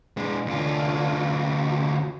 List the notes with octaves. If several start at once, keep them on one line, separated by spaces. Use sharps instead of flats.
G#3 D4
D2 D3 F4
F#4